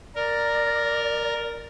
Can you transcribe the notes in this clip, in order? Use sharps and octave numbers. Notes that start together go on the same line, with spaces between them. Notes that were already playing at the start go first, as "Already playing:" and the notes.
A#4 D5